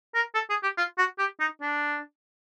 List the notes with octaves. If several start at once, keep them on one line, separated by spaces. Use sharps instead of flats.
A#4
A4
G#4
G4
F4
F#4
G4
D#4
D4